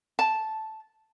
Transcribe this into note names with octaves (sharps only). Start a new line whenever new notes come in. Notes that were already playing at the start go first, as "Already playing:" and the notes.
A5